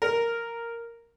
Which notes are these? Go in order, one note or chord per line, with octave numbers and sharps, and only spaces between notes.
A#4